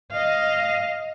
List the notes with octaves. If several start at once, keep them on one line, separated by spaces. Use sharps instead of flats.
D#5 F5